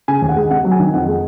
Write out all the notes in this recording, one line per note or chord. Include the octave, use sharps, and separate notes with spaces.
C#3 G#5
D#2
F#5
G#3
C3 F#5
F#3
G#5
D#3
F2 F#5
G#3